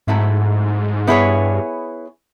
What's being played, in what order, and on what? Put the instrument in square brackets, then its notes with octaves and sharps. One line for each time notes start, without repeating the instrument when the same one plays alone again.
[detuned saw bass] G#2 [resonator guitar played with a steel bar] F#3 A3 C4 E4
[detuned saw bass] G2 [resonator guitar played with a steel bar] B3 E4 G#4 C#5